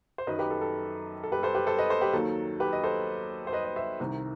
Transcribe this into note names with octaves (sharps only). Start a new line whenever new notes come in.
C5
F#2 D#3 F#3 B4 D#5
G4 B4
A4
A4
A4
G4 B4
A4 C5
G4 B4
A4 C5
B4 D#5
A4 C5
G4 B4
D#2 D#3 F#3 A4
G4 B4
D#5
A4 C5
C5
B4 D#5
D#5
C5 E5
C2 C3 D#3